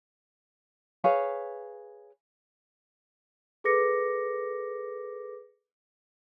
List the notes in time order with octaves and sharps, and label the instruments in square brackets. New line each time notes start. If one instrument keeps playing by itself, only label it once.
[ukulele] G#4 B4 C#5 F5
[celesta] G#4 A4 B4 D6 A#6 C#7